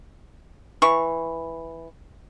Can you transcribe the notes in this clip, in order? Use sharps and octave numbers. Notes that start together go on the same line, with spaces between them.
E3 C#6